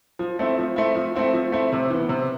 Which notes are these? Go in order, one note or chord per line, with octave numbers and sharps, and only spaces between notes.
F3
A3 C4 E4
F3
A3 C4 E4
F3
A3 C4 E4
F3
A3 C4 E4
C3
E3 B3
C3